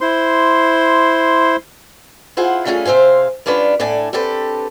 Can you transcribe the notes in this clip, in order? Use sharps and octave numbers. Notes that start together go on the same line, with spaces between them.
E4 C5 C6
E4 F4 G#4 C5 F#5
G3 A3 C#4 F4 F#4 G#4
C3 C4 C5 F5 G#5
G3 C#4 D4 F4 B4
A2 D4 A4 D5 G#5
C4 D4 G4 A4 B4